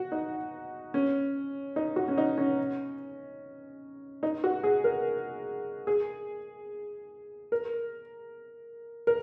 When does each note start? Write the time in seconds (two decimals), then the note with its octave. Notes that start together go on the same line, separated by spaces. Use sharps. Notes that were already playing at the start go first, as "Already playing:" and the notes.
Already playing: F#4
0.12 D#4
0.94 C#4
1.76 D#4
1.96 F#4
2.08 C#4
2.18 D#4
2.38 C#4
4.23 D#4
4.44 F#4
4.64 G#4
4.84 A#4
5.87 G#4
7.52 A#4
9.07 A#4